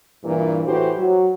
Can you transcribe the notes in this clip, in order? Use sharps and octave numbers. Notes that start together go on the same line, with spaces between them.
G2 A#2 E3
A2 E3 F#4 G4 C5
F#3